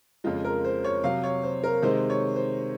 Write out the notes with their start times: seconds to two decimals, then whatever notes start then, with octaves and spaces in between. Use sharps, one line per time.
0.24 F2 C#3 G#3 F4
0.44 A#4
0.64 C5
0.84 C#5
1.04 C3 F#3 F5
1.24 C#5
1.43 C5
1.63 A#4
1.82 C3 D#3 G#3 C5
2.10 C#5
2.36 C5